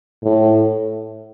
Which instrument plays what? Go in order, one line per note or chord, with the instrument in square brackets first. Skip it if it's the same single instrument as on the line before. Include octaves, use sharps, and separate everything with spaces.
[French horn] A2